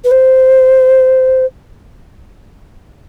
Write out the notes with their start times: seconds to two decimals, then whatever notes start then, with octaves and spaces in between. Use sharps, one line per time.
0.04 B4
0.11 C5